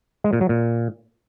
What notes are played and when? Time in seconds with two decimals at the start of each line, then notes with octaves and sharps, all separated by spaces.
0.24 G#3
0.33 A#2
0.41 F#3
0.49 A#2